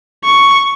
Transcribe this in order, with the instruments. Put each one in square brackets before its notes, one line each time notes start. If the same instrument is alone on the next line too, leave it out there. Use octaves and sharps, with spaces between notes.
[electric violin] C#6